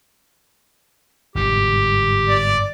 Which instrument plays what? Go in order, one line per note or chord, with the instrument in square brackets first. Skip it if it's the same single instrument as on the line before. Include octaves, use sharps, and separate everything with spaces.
[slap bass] G1 G#2 B2 [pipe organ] G4
[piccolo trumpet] D5